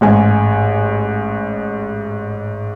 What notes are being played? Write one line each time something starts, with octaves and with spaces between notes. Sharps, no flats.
A1 G#2 G#5